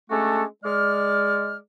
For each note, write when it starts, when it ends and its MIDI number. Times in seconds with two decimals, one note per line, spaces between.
0.10 0.43 56
0.10 0.43 57
0.10 0.43 61
0.10 0.43 62
0.10 0.43 66
0.10 0.43 69
0.64 1.56 56
0.64 1.56 74
0.64 1.56 89